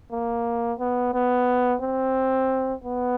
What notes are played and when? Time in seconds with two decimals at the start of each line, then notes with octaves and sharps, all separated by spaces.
0.12 A#3
0.80 B3
1.14 B3
1.82 C4
2.84 B3